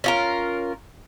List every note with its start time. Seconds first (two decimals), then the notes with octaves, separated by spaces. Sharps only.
0.04 C#4 F4 A#4